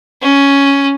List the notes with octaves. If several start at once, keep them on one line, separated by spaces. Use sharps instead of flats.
C#4